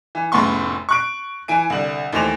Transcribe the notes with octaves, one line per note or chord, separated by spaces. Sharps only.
E3
F1 A2 C#3 B3 C6 C#6
C#6 F#6 D7
E3 G#5 D7
C2 D3 F#7
D#2 E3 A3 C5 E7 F7